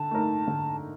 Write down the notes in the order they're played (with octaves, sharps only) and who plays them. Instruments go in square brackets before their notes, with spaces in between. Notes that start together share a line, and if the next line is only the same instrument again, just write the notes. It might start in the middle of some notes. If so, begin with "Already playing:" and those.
Already playing: [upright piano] D3 [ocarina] A5
[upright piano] A3 D#4 A#4
D3